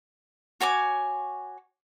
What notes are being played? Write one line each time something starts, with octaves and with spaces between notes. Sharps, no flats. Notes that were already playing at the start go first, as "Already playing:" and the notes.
F#4 C#5 G#5 D6